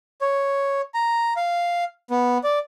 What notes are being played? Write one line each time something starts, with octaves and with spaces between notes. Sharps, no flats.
C#5
A#5
F5
B3
D5